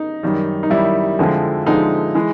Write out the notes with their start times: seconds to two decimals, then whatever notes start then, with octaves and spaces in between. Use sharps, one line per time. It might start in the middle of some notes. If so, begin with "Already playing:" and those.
Already playing: D#4
0.23 F#2 D#3 G3
0.63 D#4
0.70 F#2 D#3 G3 E4
1.19 F2 D3 F3 G#3
1.67 F2 D3 F3 G#3 D#4
2.15 E3 G#3